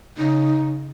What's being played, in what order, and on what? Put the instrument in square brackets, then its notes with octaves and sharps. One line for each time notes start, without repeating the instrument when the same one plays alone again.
[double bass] C#3 [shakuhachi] D#4